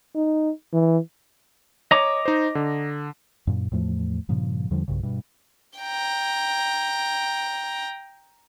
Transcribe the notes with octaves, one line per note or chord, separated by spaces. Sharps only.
D#4
E3
C#5 D#5 A#5 D6
D#4 C5
D3
F#2 A#2
E2 A2 F3 A3
G2 A#2 C#3 F3
E2 D3 F3 G3
B1 G2 C#3
G2 B2
G5 A#5